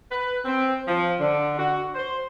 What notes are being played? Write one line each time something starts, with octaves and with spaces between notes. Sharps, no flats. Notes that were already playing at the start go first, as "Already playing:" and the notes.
B4
C4
F3
D3
F#4
C5